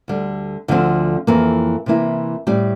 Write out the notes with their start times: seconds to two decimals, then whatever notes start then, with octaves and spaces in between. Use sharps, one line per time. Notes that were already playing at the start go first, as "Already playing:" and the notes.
0.08 D2 D3 G3
0.68 D2 D3 F3 C4
1.27 F2 E3 A#3
1.86 C3 E3 A#3 E4
2.47 A2 G3 C4 G4